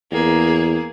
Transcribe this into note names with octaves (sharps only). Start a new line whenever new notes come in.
E2 A#3 G#4